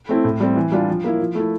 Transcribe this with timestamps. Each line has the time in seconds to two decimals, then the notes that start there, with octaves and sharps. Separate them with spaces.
0.09 A3 C4 E4
0.24 A2
0.40 G3 C4
0.56 E3
0.72 G3 D4 F4
0.88 F3
1.04 A#3 E4
1.19 F3
1.35 A3 E4